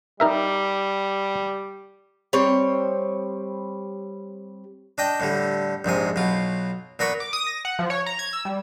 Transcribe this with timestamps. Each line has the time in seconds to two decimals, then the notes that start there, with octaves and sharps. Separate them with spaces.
0.20 G3 D#4 A#4 E5
2.33 G3 C4 C#5
4.98 D4 D#5 G5
5.20 A2 D3 G3
5.85 A#1 G#2 C3 G#5
6.16 B1 B2 F4
6.99 A#2 B3 A#4 B5 C#6
7.20 D6
7.33 D#6
7.47 A#6
7.65 F#5
7.79 F3
7.90 C#5
8.06 A#5
8.19 G#6
8.33 E6
8.45 G3